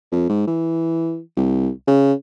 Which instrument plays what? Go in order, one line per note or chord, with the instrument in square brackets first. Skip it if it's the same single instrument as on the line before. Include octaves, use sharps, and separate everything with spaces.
[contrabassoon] F2
G#2
E3
C2
C#3